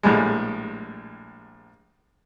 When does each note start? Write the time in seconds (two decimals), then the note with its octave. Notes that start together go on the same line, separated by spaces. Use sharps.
0.03 A#1 A2 G3 G#3